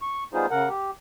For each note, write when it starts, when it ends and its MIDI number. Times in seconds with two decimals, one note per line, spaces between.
0.02 0.24 85
0.34 0.46 55
0.34 0.46 59
0.34 0.46 63
0.34 0.46 65
0.34 0.46 68
0.34 0.46 72
0.51 0.69 49
0.51 0.69 70
0.51 0.69 78
0.69 0.91 67